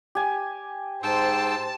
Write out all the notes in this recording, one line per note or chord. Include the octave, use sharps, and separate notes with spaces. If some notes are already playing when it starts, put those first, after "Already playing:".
G4 G#5
G#2 C5 G5 A5 E6